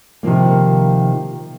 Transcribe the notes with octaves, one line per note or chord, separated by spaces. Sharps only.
C3 D#3 F3 A#3